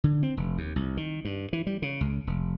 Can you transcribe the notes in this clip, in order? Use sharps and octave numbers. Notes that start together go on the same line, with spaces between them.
D3
C4
F1
D#2
C2
D#3
G2
E3
G3
C#3
C#2
F1